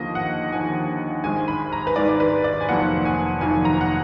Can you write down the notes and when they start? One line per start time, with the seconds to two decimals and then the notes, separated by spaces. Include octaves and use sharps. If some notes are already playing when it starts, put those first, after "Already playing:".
Already playing: D#2 D3 F3 A#3 D#5
0.15 F#5
0.51 D#2 D3 F3 A#3 G#5
1.24 G#1 G#2 D#3 G#3 G#5
1.48 B5
1.73 A#5
1.87 B4
1.96 G#1 G#2 D#3 G#3 D5
2.09 D5
2.20 B4
2.44 D5
2.61 G#5
2.69 F1 F2 D#3 F#3 A#3 F#5
3.05 G#5
3.41 F1 F2 D#3 F#3 A#3 G#5
3.65 A#5
3.81 F#5